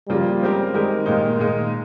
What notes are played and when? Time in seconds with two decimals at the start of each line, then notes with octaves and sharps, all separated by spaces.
0.09 C#3 F3 G3 A#3 F4
0.42 G#3 C4 G4 A#4
0.74 D#3 G#3 C4 G4 A#4
1.06 A#2 G#3 D#4
1.39 A#2 G#3 D#4